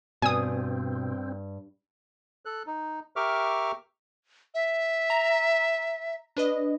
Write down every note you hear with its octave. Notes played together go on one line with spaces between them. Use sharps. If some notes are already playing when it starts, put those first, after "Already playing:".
G2 B2 C4 G#5 D#6
A4 F#6
D#4
G4 A#4 E5 C#6 D6 F6
E5
A#5
D4 B4 D#5